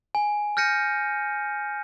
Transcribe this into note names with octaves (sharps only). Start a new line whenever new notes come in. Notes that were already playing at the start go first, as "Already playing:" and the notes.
G#5
F6 G6 A#6 C#7 D#7